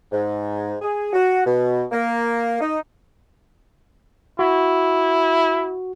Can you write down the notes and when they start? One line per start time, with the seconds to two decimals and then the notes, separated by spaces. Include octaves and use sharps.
0.12 G#2
0.82 G#4
1.13 F#4
1.46 B2
1.92 A#3
2.61 D#4
4.39 E4 F#4